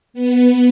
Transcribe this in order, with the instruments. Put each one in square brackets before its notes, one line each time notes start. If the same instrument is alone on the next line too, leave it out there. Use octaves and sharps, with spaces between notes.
[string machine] B3